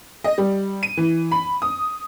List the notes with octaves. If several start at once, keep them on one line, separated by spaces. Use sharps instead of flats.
D#5
G3
D#7
E3
B5
D#6